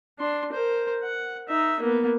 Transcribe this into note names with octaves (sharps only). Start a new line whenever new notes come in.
D4 C6
A#4 C5
F#5
D#4 E5
A#3 B3